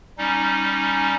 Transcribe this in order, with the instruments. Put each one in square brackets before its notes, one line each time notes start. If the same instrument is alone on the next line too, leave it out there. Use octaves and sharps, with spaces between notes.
[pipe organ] G3 C#4 D#4